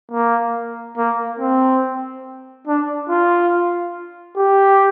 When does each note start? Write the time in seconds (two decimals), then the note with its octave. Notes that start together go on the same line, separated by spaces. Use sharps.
0.12 A#3
0.97 A#3
1.40 C4
2.67 D4
3.09 F4
4.37 G4